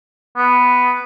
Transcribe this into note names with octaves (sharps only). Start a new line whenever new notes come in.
B3